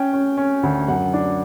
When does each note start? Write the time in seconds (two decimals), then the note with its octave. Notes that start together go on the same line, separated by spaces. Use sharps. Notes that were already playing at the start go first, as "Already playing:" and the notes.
Already playing: C#4 G5
0.13 C#4
0.37 C#4
0.63 D2
0.88 F#2 F#5
1.14 D4